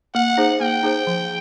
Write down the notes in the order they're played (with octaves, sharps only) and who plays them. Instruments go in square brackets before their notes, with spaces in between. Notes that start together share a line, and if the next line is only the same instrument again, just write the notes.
[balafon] A#3 [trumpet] F#5
[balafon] D#4 G#4 C5
[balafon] A#3 [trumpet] G5
[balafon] D#4 G#4 C5
F3